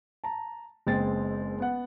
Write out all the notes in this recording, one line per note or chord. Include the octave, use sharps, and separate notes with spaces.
A5 A#5
F#1 G#3 B3 C4 G5 A6
B3 F#5